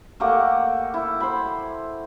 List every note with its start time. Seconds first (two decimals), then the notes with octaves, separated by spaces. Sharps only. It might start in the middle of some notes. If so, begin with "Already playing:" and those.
0.20 A3 A#3 G4 F#5
0.94 E4
1.20 C5 B5